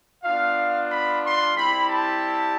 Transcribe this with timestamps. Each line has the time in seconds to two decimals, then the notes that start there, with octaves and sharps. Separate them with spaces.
0.23 B3 D4 F4 F5
0.89 B5
1.23 C6
1.55 G3 C4 E4 G4 B5
1.88 A5